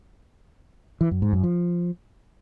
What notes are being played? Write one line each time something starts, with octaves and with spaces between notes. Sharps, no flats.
E3
F#2
G#2
F#2
F3